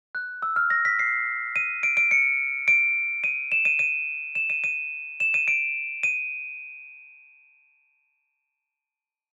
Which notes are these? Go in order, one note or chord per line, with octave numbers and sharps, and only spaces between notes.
F#6
E6
F6
A#6
B6
C7
D#7
D7
D7
C#7
D7
D#7
E7
D#7
D#7
E7
D#7
D#7
E7
D#7
D7
D#7